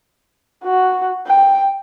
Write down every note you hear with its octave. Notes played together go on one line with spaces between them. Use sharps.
F#4
G5